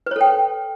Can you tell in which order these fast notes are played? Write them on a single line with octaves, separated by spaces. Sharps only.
B4 C#5 A4 G5